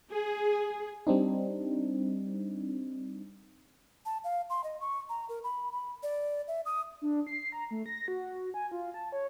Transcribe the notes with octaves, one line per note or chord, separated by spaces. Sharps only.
G#4
G3 C4 D4 D#4
A5
F5
C6
D#5
C#6
A#5
A#4
B5
B5
D5
E5
D#6
D4
C7
A#5
A3
A#6
F#4
G#5
F4
A5
C#5